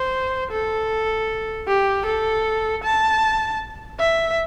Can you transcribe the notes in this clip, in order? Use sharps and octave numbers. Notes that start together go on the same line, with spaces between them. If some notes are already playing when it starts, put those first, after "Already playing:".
Already playing: C5
A4
G4
A4
A5
E5